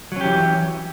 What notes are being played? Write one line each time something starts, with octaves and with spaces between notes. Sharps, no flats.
E3 F#3 C#4 G4